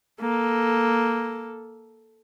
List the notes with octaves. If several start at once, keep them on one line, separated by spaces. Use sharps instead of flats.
A#3 A4